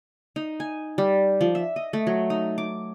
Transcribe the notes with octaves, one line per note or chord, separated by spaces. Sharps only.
D#4
G#5
G3
F3
E5
D#5
A3
F#3
D#4
D6